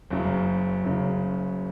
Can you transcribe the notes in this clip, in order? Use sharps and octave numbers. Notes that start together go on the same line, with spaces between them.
F#1 F#2 C#3
F#1 F#2 C#3